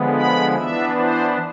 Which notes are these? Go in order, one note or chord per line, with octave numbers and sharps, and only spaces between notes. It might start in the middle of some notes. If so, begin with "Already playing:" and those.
Already playing: D3 F3 G#3 B3
B5
E3 B3 D4 E5
C5